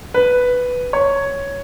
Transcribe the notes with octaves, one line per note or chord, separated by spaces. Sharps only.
B4
C#5